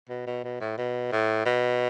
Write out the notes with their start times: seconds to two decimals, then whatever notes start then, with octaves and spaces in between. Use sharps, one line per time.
0.09 B2
0.27 B2
0.44 B2
0.61 A2
0.78 B2
1.12 A2
1.46 B2